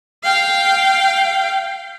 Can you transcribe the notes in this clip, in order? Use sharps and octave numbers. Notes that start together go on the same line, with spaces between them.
F5 G5